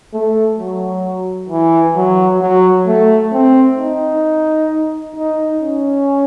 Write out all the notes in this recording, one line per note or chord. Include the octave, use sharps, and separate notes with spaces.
A3
F#3
E3
F#3
F#3
A3
C4
D#4
D#4
C#4